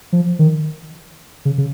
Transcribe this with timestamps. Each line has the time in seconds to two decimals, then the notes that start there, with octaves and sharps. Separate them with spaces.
0.13 F3
0.39 D#3
1.45 C#3
1.58 C#3